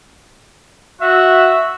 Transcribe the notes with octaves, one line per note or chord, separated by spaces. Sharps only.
F#4 E5